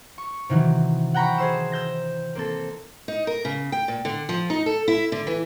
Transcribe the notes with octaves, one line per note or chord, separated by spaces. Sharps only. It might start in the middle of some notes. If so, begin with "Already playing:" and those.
C#6
C3 D#3 E3 F#3
F#5 G5 A#5 B5 C#6
G#4 C5 E6
E6 G6 A#6
A#3 C4 A4
D#4
A#4
C#3
G5
A#2
D3
F3
D#4
A4
E4
D3
E3